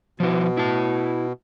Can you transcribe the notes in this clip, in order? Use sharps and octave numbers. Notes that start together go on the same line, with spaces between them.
B2 F3 E4
E4 A5